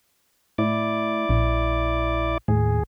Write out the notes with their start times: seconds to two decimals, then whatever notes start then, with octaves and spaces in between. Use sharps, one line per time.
0.58 A2 E4 D5 D6
1.29 A#1
2.48 D#2 A2 G#4